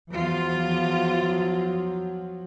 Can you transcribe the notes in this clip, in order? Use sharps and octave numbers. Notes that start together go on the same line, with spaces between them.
E2 F3 F#3 F4